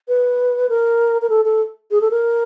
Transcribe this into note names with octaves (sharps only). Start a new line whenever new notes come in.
B4
A#4
A#4
A4
A4
G#4
A4
A#4